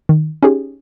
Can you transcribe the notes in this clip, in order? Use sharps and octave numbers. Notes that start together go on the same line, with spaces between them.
D#3
C#4 D#4 G4 G#4